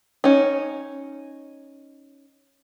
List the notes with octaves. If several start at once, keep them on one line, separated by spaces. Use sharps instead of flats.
C#4 D#4